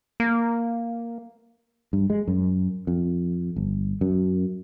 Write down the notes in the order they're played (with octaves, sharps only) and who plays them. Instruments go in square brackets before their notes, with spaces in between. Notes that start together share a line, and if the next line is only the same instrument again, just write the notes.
[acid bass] A#3
[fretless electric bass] G2
G#3
F#2
F2
G1
F#2